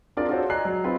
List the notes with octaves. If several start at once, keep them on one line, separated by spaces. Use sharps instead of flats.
C4 D4 F4 G#4 A#4 D5
F4 F#4 G#4 A4 C5 C#5
D5 D#5 G#5 A#5 F#6 C7
F#3
C4 F4 G#4 B4 D#5